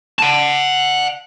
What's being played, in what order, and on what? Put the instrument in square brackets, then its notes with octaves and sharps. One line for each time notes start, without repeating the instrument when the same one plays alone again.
[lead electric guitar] F#5 A5